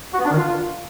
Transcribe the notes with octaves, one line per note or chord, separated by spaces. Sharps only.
F#4
B3
D4
D#3
F4